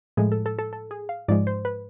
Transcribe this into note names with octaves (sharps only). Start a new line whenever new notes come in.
A2 F3 G#3 G#4
A4
A4
A4
A4
G#4
F5
G#2 F3 G#3 D5
C5
B4